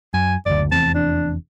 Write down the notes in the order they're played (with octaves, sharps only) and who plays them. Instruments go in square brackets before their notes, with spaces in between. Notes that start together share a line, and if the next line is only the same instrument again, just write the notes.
[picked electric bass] F#2 [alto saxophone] G#5
[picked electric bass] F#1 D2 [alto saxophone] D5
[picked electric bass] F1 E2 C4 [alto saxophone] A5
[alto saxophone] D4